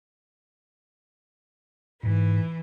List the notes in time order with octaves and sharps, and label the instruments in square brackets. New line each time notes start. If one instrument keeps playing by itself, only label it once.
[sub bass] G#2 [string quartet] E3